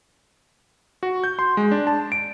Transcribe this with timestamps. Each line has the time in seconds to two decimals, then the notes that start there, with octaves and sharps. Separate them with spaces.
1.03 F#4
1.24 G6
1.39 C6
1.57 G#3
1.71 D4
1.87 A5
2.12 D7